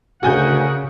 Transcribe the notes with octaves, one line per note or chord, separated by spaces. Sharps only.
D2 C#3 F#4 A#4 F#5 G#5 G6